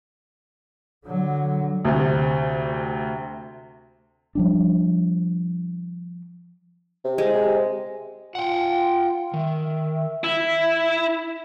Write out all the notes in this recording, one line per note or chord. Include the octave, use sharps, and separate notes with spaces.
D3 F#3
D2 C3
F3 G3 D4
C3
G#3
C3
F4 F#5 G5
D#3 E5
E4